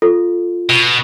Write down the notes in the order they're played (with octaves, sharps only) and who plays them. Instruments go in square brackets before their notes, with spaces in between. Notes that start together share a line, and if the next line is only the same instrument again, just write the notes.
[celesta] F4 [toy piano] A4
[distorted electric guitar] B2